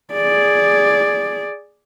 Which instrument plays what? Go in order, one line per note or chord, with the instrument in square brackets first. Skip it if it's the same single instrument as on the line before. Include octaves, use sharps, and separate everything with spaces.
[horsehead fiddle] G#4 D5